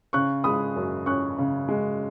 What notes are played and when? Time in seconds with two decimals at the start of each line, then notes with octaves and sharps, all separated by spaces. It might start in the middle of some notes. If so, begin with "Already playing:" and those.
0.13 C#3 C#6 F#6
0.44 G#3 B5 D#6
0.76 F#2
1.06 C#4 C#6 F#6
1.38 C#3
1.68 G#3